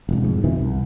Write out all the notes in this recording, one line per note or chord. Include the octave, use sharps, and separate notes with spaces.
E1 C2
F2 G#2
F2 B2 D#3 E3
C2